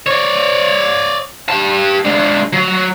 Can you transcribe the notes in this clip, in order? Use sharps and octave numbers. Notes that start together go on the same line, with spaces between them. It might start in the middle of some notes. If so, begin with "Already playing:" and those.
C#5 D5
G4 A5
G#3 D4
F#3